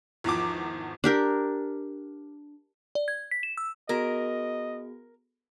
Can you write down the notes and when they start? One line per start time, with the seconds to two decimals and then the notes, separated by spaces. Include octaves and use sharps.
0.24 G#1 E2 F3 D6
1.04 D4 G4 A#4
2.95 D5
3.08 G#6
3.31 B6
3.43 E7
3.57 E6
3.89 B3 F#4 G#4 A#4 D#5